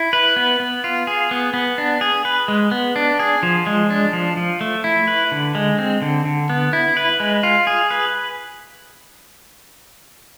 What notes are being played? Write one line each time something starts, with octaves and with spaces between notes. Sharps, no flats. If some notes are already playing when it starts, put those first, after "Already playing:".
Already playing: E4
B4
B3
B3
F4
G#4
B3
B3
D4
G#4
B4
G#3
B3
D4
G#4
F3
G#3
D4
F3
F3
A3
E4
B4
D3
G#3
C4
D3
D3
B3
E4
B4
G#3
F4
G#4
B4